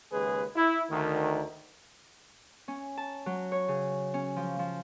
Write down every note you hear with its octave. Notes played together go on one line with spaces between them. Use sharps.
D#2 C#3 G#3 G#4 B4
E4
D2 D#3
C#4
A5
F#3
C#5
C#3
C#4
F3
F3